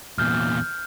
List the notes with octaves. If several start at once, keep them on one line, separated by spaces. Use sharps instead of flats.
E2 A#2 F6 G6